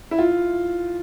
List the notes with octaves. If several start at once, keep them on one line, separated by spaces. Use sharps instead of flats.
E4
F4